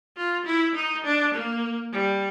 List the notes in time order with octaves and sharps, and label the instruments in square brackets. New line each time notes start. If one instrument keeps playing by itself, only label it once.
[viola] F4
E4
D#4
D4
A#3
G3